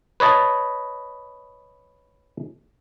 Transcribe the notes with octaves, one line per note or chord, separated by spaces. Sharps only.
B4 C#5 D#5 A5